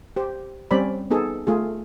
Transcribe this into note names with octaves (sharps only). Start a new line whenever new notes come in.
G4 C5
G3 C4 C#4 C5 D5 B5
B3 D#4 G#4 A4
A3 F4 G#4